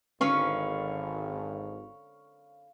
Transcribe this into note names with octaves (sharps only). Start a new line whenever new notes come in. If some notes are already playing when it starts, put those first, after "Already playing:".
G#1 D3 C#4 B4 F5 C#6